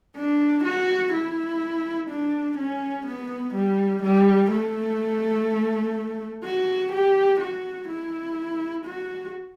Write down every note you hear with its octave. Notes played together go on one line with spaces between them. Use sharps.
D4
F#4
E4
D4
C#4
B3
G3
G3
A3
F#4
G4
F#4
E4
F#4